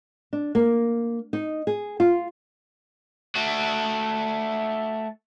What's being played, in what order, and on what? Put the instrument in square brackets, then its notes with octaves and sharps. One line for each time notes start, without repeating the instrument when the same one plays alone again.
[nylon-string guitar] D4
A#3
D#4
G#4
F4
[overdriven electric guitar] A3 F#4